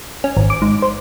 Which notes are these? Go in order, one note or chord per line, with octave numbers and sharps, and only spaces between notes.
C#4
G#1
D6
G#2
C5